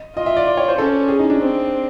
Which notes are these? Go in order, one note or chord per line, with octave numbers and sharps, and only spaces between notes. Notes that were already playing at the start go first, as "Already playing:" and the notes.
Already playing: D#5
F4 D#5
E5
D5
D5
C#5
C5
C#4 A4
G#4
D#4
D4
C4